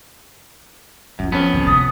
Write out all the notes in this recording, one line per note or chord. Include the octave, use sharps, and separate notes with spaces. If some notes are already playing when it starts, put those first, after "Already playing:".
F#2 F3 F4
F2 B3 C#4
C#2 C#3
C3 D#6 A6